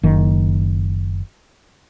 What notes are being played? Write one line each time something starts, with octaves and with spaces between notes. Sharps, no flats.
F#1 D#3